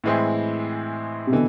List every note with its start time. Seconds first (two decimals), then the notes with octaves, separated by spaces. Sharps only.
0.04 A2 E3 G#3 C4 E4
1.27 C3
1.32 B2 D3 E3